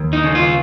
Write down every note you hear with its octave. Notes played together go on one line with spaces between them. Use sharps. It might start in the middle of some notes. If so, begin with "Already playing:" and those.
Already playing: D#2
D#4
C#3
F4